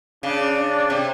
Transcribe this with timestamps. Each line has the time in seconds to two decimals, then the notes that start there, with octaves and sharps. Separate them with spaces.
0.23 C#3 D4
0.56 D4
0.90 C3